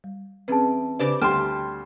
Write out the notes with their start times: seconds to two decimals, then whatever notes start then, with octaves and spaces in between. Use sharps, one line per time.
0.04 G3
0.48 E2 C4 C#4 G#4 B4 A5
0.99 C#3 D4 G4 B4 C5 D5
1.21 D2 G3 G5 A5 C6 F6